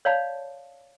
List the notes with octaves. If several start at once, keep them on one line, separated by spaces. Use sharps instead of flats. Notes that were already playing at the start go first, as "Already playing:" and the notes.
C#5 D5 F5 A5 B5